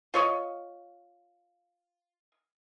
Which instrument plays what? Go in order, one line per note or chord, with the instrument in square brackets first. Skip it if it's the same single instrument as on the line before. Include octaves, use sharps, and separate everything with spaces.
[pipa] F4 C#5 D#5